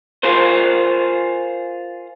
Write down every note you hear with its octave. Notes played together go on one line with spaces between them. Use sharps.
F4 G#4 A#4 C5